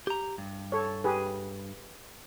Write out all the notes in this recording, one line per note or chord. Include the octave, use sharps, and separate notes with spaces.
G4 A#5
G2
A4 C#5
G4 G#4 B4